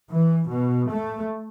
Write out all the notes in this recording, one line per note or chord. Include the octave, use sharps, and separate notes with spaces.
E3
B2
A3